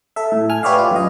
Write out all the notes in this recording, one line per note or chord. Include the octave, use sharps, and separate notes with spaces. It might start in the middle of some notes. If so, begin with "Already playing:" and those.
A4 E5
A2
G#5 F6
G4 B4 C#5 D5 E5 F5
F4
F#2 D#5